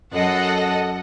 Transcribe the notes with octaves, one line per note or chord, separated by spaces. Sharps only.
F#2 A4 D#5 F#5